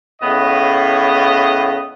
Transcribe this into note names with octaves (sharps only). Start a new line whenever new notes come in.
A2 C#3 B3 D#5